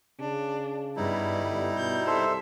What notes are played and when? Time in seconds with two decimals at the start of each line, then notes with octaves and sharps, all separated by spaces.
0.19 C#3 D4
0.97 G2 G3 B3 D#4 E4
1.39 G1
1.77 B2 G6
2.07 C2 A4 C5 E5